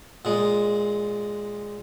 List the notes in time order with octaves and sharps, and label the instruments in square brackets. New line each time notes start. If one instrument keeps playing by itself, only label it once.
[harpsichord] A#2 G#3